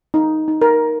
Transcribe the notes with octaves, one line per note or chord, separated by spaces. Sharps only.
D#4
D#4
A#4